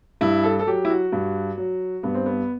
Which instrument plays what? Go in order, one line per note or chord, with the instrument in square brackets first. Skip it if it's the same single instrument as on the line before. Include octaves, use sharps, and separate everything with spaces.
[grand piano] G2 E4
A4
A4
F#3 G4
E4
F#4
G2
F#3
G2 B3
C4
B3